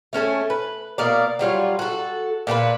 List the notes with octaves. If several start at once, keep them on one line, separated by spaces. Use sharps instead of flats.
A3 C#4 A4 G#5
B4
B2 A#3 A#4 D5
F#3 G3 F4 C#5
F#4 A4
A#2 D4 F#4 B4